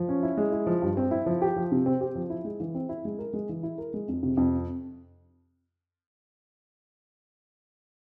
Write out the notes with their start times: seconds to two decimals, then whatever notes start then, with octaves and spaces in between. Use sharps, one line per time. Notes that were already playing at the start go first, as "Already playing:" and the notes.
Already playing: F3
0.09 C#4
0.23 E4
0.37 G#3
0.52 E4
0.67 F3
0.82 G2
0.97 C4
1.11 E4
1.26 F3
1.42 G4
1.56 F3
1.72 C3
1.86 C4
2.01 G4
2.16 F3
2.30 E4
2.45 G#3
2.60 E3
2.75 C4
2.89 E4
3.05 G#3
3.19 A#4
3.33 G#3
3.49 E3
3.63 E4
3.78 A#4
3.94 G#3
4.08 F2
4.23 C3
4.37 F2